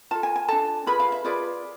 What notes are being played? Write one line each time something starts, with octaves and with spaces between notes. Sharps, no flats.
F4 A4 A5
G#5
G#5
D4 A4 A5
F4 G#4 B4 B5
F5
E5
F4 G#4 B4 D5